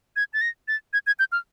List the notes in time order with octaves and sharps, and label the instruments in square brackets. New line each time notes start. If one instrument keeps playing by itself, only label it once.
[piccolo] G#6
A6
A#6
A6
G#6
G#6
G6
F6